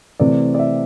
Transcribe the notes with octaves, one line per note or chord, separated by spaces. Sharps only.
C3 E3 A3 C4 D5
D5
E5